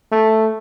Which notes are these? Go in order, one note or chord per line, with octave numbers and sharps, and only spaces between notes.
A3